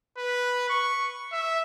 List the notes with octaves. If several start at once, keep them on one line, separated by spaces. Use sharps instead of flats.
B4
C#6
E5